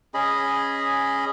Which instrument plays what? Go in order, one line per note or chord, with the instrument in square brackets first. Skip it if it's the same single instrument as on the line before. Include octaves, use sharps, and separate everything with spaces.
[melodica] C#4 G#4 D#5 B5